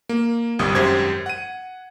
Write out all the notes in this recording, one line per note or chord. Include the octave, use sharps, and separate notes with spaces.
A#3
G1 C2 G3 D#6
G#1 F#2 G4 C5 G#6
F#5 D#7